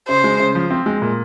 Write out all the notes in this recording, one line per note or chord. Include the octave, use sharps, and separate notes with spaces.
C#3 C5
G#3
C#3
F3
C4
G#3
A#2